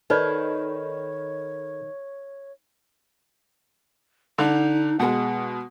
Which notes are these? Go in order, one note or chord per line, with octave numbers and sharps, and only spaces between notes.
D#3 D#4 A4 B4 C#5 D5 B5 G#6
D3 D#4
B2 G#3 F#5